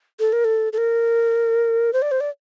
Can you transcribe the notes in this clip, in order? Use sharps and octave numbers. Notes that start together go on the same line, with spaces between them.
A4
A#4
A4
A4
A#4
C5
D5
C5
D5